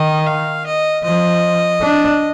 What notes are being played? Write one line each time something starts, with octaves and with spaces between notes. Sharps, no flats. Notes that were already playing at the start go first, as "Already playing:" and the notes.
Already playing: D#3 D#5
F5
D#5
F3 D#5
D4